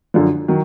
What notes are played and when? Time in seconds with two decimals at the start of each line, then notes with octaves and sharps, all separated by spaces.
0.14 F#2 D3 F3
0.48 D#3 F#3